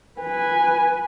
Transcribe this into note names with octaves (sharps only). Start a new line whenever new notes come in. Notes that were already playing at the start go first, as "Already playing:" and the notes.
B4 G#5